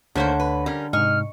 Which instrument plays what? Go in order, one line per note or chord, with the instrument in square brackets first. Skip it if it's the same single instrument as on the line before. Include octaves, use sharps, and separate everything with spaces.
[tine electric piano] D2 C#5 [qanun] D3 E5 [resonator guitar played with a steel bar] D#3 A#3 C5
[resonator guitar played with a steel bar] B4
G3 C#4 A#4
[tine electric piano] G#2 C3 [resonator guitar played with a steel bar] D#5 [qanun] C#6 [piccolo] F6